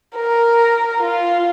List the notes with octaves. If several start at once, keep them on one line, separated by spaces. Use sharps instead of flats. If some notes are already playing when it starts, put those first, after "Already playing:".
A#4
F4